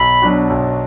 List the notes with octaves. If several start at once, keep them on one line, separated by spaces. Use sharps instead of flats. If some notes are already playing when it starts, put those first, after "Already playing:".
Already playing: B1 B5
B2 F#3 D4 F#4
B1